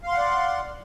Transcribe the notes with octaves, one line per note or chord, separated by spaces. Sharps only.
D5 F5 F#5 C6